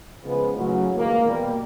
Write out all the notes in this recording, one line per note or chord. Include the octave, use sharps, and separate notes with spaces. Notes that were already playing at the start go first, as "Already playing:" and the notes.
C#2 C#3 F3 G#3 B3 B4
A2 C#3 F#3
D#2 E3 G#3 A#3
B2 G3 A#3